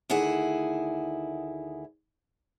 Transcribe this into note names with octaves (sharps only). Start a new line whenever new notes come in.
D2 D#3 E4 G#4 F#5